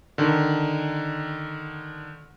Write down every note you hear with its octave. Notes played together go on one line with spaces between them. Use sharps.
D3 D#3